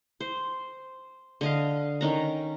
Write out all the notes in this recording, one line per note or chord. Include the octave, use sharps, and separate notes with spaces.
C5
D3 D#5 F5
D#3 C#4 A#5